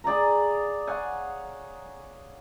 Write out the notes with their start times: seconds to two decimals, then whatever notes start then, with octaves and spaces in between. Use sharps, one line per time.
0.04 G#4 D5 F5 A#5
0.87 C#5 F5 F#5 G#5